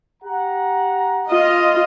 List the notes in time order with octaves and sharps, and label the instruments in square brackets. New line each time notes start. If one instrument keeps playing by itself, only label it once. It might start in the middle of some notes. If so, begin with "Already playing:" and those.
[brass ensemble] G4 F#5 A#5
[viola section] F4 D#5